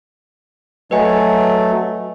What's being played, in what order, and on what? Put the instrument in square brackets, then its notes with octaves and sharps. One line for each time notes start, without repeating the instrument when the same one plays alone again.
[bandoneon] F#3 A3 [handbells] B4 D#5 G#5